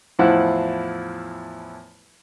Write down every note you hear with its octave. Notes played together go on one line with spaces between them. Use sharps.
E2 A2 F3 E4 F#5